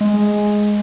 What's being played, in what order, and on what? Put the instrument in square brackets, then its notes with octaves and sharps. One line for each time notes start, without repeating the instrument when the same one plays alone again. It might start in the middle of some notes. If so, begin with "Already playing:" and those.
[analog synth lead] G#3